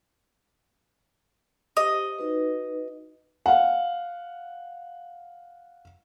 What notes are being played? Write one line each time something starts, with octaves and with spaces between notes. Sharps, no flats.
G4 C5 D#5
D#4 F#4 B4
F5 F#5